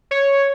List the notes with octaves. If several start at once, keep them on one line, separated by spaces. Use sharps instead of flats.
C#5